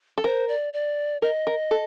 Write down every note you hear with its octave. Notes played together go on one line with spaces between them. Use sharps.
A4
A#4 C5
D5
D5
A#4 D#5
A#4
A4